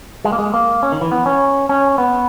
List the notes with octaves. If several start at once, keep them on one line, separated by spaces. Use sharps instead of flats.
G#3
A#3
G#3
A#3
C#4
D#3
E3
B3
C#4
C#4
B3